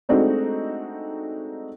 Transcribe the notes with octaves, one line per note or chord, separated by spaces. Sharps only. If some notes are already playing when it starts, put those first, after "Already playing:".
G#3 A3 C4 D4 D#4 F#4